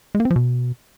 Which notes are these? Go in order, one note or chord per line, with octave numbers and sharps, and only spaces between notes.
G#3
A#3
C4
F3
B2